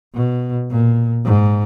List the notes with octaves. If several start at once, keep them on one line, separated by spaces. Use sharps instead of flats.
B2
A#2
G#2